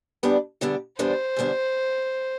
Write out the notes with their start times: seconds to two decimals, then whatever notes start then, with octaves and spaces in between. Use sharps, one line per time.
0.23 E2 D3 G3 B3 D4
0.61 E2 D3 G3 B3 D4
0.99 E2 D3 G3 B3 D4 C5
1.36 E2 D3 G3 B3 D4